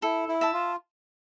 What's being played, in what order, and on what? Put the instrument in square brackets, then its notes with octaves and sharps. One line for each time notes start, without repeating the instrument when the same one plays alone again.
[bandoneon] E4 [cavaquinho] A4
[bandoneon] E4
[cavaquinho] E5 A5
[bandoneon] F4